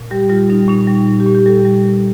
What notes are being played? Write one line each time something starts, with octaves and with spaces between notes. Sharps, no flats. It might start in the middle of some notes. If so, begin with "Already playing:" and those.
Already playing: A#2
G3 G4
G3 F4
G3 D#4
A#2 D#4
G3
A#2
G4
A#2
G4
G3 A4
G3
A#2